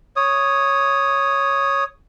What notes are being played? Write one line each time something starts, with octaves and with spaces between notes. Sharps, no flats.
C#5 D#6